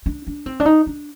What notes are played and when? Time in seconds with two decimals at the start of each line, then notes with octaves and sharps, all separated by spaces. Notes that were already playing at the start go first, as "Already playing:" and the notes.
0.06 D4
0.27 D4
0.46 C4
0.60 D4
0.65 D#4
0.86 D4